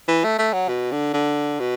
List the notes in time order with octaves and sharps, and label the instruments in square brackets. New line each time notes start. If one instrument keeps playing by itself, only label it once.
[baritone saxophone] E3
A3
A3
F#3
B2
D3
D3
B2